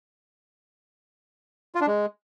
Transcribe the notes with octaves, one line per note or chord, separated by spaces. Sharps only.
F4
D4
G#3